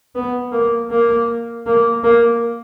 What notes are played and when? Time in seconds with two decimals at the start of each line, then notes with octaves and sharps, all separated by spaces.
0.15 B3
0.52 A#3
0.91 A#3
1.66 A#3
2.03 A#3